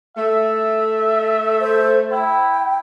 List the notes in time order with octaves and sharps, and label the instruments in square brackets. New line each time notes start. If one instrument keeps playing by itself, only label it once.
[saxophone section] A3 [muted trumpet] E5
[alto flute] C5
[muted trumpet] E4 [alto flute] G5